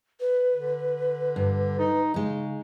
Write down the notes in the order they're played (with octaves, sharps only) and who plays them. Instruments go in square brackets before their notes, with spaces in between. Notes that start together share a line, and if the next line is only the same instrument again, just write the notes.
[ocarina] B4
[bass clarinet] D3
[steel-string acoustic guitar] G2
[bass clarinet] D#4
[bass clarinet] C#3 [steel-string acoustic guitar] G#3 D#4